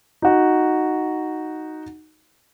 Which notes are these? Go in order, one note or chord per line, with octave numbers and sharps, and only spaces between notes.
D#4 F#4